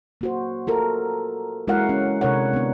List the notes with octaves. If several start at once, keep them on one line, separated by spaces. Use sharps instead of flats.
A#3 F#4 C5
F4 A4 A#4
G#3 E4 F#4 A#4 F5 F#5
C#4
C3 D4 A#4 C#5 F#5
B3 D4